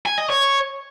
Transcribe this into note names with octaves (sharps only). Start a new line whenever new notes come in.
G#5
D#5
C#5